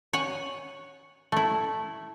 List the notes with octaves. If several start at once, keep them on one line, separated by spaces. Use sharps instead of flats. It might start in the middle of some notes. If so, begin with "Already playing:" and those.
C#5 F#5 G#5
A3 E4